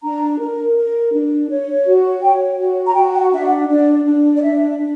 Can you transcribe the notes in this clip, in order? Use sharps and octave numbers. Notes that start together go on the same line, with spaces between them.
D4 A#5
A#4
A#4
D4
C#5
F#4
C#5 G5
F#4
A#5
F#4 G5
G5
F#5
D4 E5
F#5
D4 D5
D4
D5
D4 E5
D4